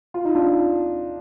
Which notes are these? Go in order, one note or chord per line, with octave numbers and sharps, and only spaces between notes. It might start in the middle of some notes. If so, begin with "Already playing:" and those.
F4
D#4
D4 F4